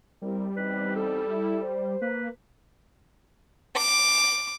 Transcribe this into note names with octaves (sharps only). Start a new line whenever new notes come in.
G3 C4 E4 A#4
E2 C4 D#4 B4
A4
E4
C5
A#3 B4
D6